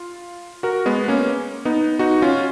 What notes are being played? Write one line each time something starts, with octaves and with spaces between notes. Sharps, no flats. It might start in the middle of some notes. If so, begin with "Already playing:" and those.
Already playing: F4
F#4 A#4
G#3 B3
A#3 C#4
B3 D#4
D#4 F#4
C#4 F4